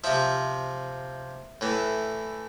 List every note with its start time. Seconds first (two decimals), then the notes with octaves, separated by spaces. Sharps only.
0.04 C3 F3 E5
1.61 A2 E3